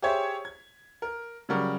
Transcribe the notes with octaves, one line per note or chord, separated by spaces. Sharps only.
G4 G#4 C5 C#5 E5
G#6
A#4
C#3 F#3 G3 A#4 C#6